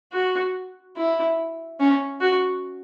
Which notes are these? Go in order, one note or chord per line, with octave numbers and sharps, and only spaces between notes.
F#4
E4
C#4
F#4